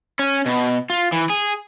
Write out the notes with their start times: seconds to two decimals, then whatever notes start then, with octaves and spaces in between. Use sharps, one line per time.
0.19 C#4
0.46 B2
0.90 F4
1.12 E3
1.30 G#4